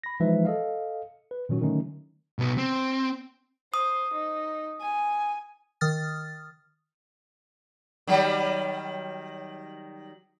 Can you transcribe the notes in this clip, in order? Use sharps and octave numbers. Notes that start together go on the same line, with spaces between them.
B5 A#6
E3 F3 G#3 D#4 B4 E5
A4 D#5 F5
B4
A#2 D#3 F#3 C#4 F#4
D3 D#3 F#3 A3 C#4 D#4
B1 B3
C4
C5 D#6
D#4
G#5
D#3 D#6 F6 A6
D#3 F#3 G3